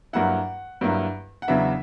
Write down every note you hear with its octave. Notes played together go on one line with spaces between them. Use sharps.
G2 F#3 A#3 E4 F#5
G2 F#3 A#3 E4
F#5
E2 C#3 F#3 B3 D4 E5